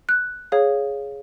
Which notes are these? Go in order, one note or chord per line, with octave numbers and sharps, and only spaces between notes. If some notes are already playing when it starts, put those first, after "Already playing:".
F#6
G#4 C#5 F5